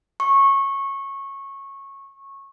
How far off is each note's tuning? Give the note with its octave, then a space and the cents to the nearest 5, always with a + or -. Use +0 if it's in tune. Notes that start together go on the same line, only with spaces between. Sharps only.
C#6 -15